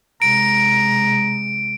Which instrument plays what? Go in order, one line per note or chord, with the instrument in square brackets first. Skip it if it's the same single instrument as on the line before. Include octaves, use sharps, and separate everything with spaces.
[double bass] C3 G#3 [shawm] A#5 [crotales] D7